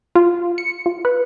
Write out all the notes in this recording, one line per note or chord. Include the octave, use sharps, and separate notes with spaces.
F4
C#7
F4
B4